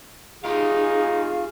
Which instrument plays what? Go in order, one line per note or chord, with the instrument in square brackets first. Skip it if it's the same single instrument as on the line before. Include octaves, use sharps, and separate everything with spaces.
[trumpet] D#4 [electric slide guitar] F4 G4 [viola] G#4 [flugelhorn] F5